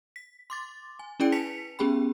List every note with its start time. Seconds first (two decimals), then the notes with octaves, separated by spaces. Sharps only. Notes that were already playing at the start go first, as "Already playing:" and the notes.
0.16 B6
0.50 C6 D6 A6
0.99 G#5
1.20 C#4 E4 G#4 D5 G5 D7
1.32 B4 G#5 A5 B6 C#7 F7
1.79 B3 C#4 G4 G#4 G5 B5